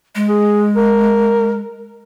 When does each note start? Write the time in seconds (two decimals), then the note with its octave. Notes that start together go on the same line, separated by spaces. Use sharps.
0.15 G#3
0.29 G#4
0.76 A#4